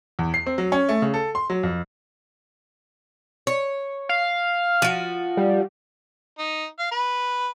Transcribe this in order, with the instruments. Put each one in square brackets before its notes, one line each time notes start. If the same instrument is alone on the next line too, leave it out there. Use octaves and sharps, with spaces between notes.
[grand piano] E2
C7
C4
F#3
C#4
A3
C#3
A4
C6
F#3
F2
[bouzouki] C#5
[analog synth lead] F5
[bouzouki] F3 F#4
[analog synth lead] G3
[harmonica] D#4
F5
B4